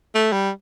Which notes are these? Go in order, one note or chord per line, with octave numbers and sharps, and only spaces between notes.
A3
G3